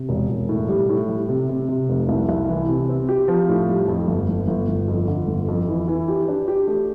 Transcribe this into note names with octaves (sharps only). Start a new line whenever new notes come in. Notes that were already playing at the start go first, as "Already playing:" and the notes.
Already playing: C3
E1
E1
A2
G3
A2
G3
C3
C3
C3
F1
C2
C2
E3
C3
C4
G4
F3
A2
G3
F2
G1
G1
G1
G1
F2
D3
G1
F2
E3
E3
G4
D4
G4
A3